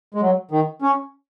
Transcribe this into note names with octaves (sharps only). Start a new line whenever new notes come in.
G#3
F#3
D#3
C#4